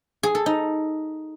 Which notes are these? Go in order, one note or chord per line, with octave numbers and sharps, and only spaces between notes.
G#4
A4
D#4